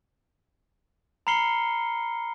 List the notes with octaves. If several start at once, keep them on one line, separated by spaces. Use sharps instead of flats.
A#5 B5 F6 C7 C#7 G7